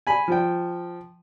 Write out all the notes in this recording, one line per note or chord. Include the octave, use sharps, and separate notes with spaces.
G#5 B5
F3 G5